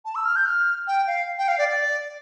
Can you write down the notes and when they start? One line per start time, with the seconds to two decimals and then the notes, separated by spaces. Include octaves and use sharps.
0.05 A5
0.15 E6
0.25 F6
0.36 G6
0.46 F6
0.87 G5
1.07 F5
1.38 G5
1.48 F5
1.58 D5
1.69 D5